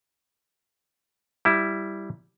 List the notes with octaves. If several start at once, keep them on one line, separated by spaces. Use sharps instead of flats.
G3 E4